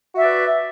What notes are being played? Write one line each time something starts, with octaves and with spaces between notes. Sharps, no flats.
F#4 B4 D5 E5